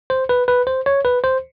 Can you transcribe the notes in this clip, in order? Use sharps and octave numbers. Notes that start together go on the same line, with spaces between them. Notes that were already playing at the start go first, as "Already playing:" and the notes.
C5
B4
B4
C5
C#5
B4
C5